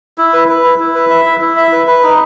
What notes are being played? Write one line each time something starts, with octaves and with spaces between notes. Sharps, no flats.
E4
B4
B4
E4
E4
B4
E5
E4
E4
E5
B4
B4
D#4